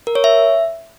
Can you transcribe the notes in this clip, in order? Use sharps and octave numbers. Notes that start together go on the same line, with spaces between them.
A#4
C#5
E5